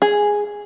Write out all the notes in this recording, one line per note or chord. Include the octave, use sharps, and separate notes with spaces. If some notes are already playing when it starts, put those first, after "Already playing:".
G#4